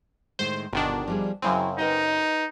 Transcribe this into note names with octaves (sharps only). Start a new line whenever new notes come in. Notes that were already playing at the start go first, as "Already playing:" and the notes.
A2 D#3 G#3 C5
G1 B2 D#3 D4
F3 G3 G#4
F#2 C#3 F#3 C4 E4 G#5
D#4 A#4 B4 D#5